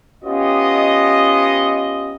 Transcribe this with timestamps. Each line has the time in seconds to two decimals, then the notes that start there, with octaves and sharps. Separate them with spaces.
0.24 B3 C#4 F4 G4 D#5